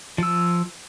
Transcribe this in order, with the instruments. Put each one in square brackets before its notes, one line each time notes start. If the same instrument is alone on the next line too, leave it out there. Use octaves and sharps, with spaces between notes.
[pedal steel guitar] F3 E6